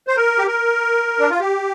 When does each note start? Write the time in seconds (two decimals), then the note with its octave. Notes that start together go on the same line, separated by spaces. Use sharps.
0.07 C5
0.16 A#4
0.38 G4
0.47 A#4
1.19 D4
1.30 F4
1.40 G4